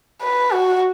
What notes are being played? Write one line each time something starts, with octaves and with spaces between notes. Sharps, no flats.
B4
F#4